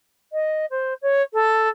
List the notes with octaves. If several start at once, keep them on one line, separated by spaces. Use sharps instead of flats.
D#5
C5
C#5
A4